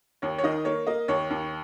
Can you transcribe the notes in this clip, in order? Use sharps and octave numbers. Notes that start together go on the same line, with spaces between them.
D#2 C#5
C#5
D#3 D#5
A#3 C#5
A#3 D#5
D#2 C#5
D#2